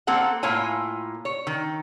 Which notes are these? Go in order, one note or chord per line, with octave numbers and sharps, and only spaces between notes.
A#3 C4 A4 F#5
A2 A#3 F4 C#5 G#5
C#5
D#3